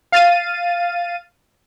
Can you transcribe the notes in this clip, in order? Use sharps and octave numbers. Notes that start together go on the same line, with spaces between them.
F5 A6 D#7